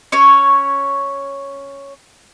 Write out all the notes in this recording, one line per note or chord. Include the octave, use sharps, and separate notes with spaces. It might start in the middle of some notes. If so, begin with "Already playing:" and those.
C#4 C#5